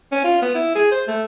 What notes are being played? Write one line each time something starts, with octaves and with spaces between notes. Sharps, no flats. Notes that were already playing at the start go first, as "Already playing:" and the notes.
C#4
F4
B3
E4
G#4
C5
A3